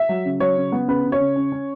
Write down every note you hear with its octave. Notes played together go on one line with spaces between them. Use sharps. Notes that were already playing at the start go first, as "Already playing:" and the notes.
Already playing: E5
F#3
C#3
F#3 C#5
C#3
B3
C#3 B4
C#3
C#5
C#3
C#4
C#4